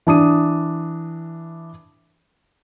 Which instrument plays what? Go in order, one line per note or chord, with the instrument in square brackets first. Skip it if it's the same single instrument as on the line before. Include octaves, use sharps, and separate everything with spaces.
[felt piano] E3 D4 D#6 D#7